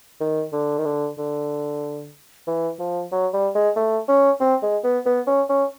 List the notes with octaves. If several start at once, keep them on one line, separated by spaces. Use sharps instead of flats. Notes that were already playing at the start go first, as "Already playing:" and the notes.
D#3
D3
D#3
D3
D3
E3
F3
F#3
G3
G#3
A3
C#4
C4
G#3
B3
B3
C#4
C#4